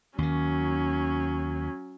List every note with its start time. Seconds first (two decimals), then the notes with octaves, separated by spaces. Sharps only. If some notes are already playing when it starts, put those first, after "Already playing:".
0.18 D#2 D#3 F#3 C#4